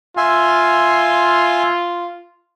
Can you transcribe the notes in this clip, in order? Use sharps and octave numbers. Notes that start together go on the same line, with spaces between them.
F4 E5 G#5 C6